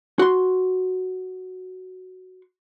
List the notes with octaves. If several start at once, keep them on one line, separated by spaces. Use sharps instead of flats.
F#4 C6